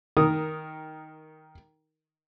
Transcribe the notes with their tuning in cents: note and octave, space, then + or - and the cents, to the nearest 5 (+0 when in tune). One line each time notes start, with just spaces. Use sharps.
D#3 +10 A#4 +0 D#6 +0